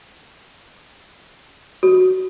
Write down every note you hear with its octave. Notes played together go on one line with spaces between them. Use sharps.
F#4